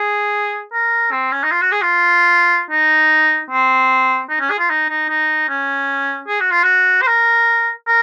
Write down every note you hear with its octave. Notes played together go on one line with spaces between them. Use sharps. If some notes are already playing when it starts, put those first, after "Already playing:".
Already playing: G#4
A#4
C4
C#4
D#4
F4
F#4
G#4
F4
D#4
C4
D#4
C#4
G#4
F4
D#4
D#4
D#4
C#4
G#4
F#4
F4
F#4
C5
A#4
A#4